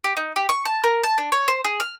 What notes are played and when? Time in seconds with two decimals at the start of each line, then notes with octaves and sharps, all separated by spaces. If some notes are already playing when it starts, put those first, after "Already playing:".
0.04 G4
0.17 D#4
0.36 G4
0.49 C#6
0.65 A5
0.84 A#4
1.04 A5
1.18 D4
1.32 C#5
1.48 C5
1.64 G#4
1.80 F6